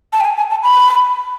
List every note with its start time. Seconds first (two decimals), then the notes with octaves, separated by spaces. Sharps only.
0.13 A5
0.21 G5
0.25 G#5
0.37 G#5
0.50 A5
0.63 B5